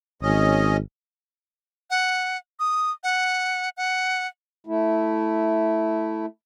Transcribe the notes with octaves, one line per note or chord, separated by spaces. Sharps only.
G#1 C#4 D#5
F#5
D#6
F#5
F#5
A3 E4